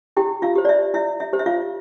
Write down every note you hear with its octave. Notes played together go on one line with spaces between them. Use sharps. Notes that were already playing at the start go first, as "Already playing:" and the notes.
E4 G4 G5
F4 F5
G4 C5
D5
E5
E4 E5
E5
G4 C5
E5
F4 F5